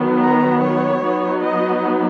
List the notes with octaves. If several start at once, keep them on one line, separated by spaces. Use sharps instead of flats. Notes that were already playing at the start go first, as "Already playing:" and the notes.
Already playing: D#3 F#3 B3
A#5
C#5
F#3 B3 D#4
D#5